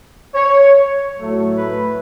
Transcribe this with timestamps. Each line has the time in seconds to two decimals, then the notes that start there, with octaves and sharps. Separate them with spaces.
0.34 C#5
1.17 A2 F#3 A3
1.57 B4